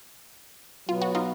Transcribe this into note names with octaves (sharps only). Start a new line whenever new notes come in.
B2 F#3 B3 F4
F#4
D#4 F4